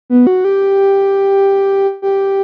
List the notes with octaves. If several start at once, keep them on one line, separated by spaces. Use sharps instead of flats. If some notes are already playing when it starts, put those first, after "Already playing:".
B3
F#4
G4
G4